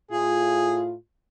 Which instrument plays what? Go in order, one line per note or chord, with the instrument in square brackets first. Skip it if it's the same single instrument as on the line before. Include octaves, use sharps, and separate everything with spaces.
[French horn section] A2 F4 [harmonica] G#4